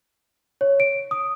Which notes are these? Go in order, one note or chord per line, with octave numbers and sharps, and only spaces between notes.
C#5
D7
D#6